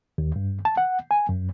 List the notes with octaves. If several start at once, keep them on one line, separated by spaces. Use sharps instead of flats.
D#2
G2
A5
F#5
G#5
F#2